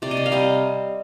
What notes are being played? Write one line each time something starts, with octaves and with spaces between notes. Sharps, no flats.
C3 D5
D#5
D5
F5
G3 C4 D#5